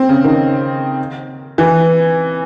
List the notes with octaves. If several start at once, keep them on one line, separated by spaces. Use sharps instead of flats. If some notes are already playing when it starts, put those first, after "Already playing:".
Already playing: C4
C#3
D#3
E3